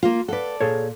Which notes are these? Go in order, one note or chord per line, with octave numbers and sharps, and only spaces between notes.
A#3 F4
A4 B4 D5 F5 F#5
A#2 G#4 A4 C#5